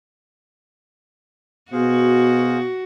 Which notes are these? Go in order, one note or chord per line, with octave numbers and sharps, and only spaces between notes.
B2 F#4 G#4 C5 F5